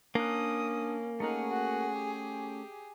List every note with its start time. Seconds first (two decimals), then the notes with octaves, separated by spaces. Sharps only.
0.15 A#3 C#4 D4 D#6 F#6
1.20 A3 C#4 D#4 G#4 A#4 F#5
1.49 F#4
1.97 G4